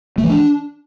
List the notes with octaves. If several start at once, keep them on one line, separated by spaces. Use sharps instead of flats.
A3
E3
D4